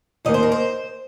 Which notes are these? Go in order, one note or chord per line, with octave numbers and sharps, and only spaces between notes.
D#2 D#3 A#3 D#5
C5
A#4
C5